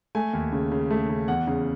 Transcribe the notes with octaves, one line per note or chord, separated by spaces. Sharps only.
A3 G#5
D#2
C#3
C#3
A3
C#3
E2 F#5
C#3